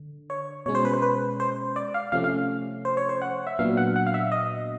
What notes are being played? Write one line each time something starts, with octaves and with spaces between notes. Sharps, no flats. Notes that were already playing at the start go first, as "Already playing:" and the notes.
Already playing: D3
C#5
B2 G#3 C#4 C#5
C5
B4
C5
B4
C5
D5
F5
C3 F3 A3 C#4 F5
F5
C5
C#5
C5
F#5
E5
A#2 F#3 B3 D4 F5
F#5
F#5
F5
E5
D#5